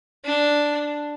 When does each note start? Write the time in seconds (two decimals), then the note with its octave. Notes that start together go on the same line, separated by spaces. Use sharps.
0.25 D4